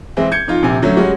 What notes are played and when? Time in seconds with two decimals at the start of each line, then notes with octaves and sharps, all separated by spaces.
0.17 E3 G#3 C4 E4
0.31 G6 G#6 C#7
0.47 F2 D#4 F4
0.63 A#1 C3 G#5
0.82 D3 F#3 A3 C#4
0.97 G3 G#3 C#4 F#4